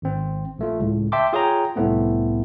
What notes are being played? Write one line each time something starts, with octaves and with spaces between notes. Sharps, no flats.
G#1 C4
A#1 A3 F4
C#2 A2
E5 G5 A5 C6 D6
F4 G#4 C#5 G5 A#5
C2 A2 A3 B3 C4